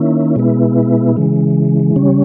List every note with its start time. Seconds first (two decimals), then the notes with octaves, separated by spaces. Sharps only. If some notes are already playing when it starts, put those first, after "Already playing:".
Already playing: D#3 A#3 C#4 E4
0.36 B2 G#3 B3 E4
1.16 C#3 E3 G#3
1.96 C#3 G3 C#4